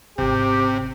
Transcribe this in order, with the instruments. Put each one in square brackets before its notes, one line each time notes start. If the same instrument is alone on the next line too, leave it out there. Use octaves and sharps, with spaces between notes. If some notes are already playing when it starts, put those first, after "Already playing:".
[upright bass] G#1 C#4 [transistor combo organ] C3 [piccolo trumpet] G4